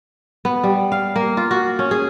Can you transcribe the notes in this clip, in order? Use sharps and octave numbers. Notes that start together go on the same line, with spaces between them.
B3
G3
F5
A#3
F4
F#4
C#4
G#4